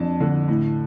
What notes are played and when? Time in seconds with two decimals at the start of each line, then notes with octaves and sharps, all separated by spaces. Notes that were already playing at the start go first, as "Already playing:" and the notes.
Already playing: F2 D4 A5
0.20 D3
0.48 A2